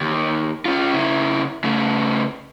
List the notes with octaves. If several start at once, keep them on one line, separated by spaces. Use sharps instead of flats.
D#2
C#4 F4
C#3 E4
C#3 A3